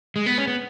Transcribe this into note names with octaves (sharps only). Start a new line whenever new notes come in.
G#3
B3
C#4
B3